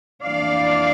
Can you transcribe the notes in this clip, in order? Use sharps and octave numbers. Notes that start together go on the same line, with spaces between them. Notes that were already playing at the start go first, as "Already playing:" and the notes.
F2 E3 A#3 D4 D5 F5